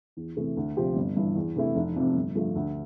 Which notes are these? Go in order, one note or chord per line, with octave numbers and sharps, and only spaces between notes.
E2
C3 E3 A3
D2
C3 F3 C4 G4
G1
G2 E3
E2
C3 E3 A3 E4
F1
F2 C3
G1
G2 F3 A3
D2